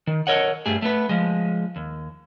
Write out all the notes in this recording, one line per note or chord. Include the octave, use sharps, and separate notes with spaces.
D#3
A4 A#4 C#5 D#5 F#5
G2 G3 A3 G#4
A3 B3 B4
F3 G#3
D#2